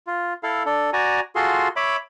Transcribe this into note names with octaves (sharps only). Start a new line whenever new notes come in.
F4
E4 A4 F5
D4 A4
F#4 D5 G#5 A#5
F4 F#4 G#4 A4 C6
C#5 E5 B5 D6